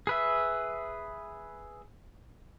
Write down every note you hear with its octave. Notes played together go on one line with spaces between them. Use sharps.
G#4 B4 E5